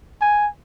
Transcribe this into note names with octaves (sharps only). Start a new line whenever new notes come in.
G#5